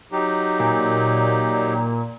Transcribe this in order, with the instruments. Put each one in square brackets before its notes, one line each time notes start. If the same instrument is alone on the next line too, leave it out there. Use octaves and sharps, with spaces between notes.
[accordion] F#3 D#4 G4
[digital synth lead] A#2